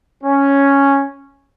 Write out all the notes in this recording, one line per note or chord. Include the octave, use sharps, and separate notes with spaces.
C#4